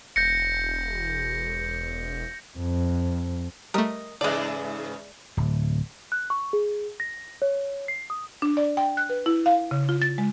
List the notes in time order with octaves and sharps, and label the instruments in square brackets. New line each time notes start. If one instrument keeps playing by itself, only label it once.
[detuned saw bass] E1 [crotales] G6 A#6 C#7
[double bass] F2
[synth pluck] G3 A3 [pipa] A#4 D#5
[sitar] G#2 C#3 E3 [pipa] G#3 D5
[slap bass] D1
[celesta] F#6
C#6
G#4
A#6
C#5
C7
D#6
[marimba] D4
D5
G5
F#6
B4
E4
F5
C#3
F4
A6
G#3